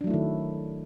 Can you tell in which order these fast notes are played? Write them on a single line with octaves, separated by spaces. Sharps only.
D4 F#3 A3 E4 D#3